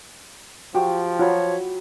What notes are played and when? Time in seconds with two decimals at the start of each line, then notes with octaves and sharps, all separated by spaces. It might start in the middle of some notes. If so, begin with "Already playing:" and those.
0.75 F3 F#4 G4
1.19 F#3 F4 C#5 B5